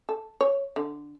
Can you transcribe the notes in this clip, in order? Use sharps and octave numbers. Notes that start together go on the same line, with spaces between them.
A4
C#5
D3